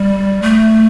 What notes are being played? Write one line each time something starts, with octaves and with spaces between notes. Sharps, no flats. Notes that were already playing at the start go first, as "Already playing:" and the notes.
Already playing: G3
A3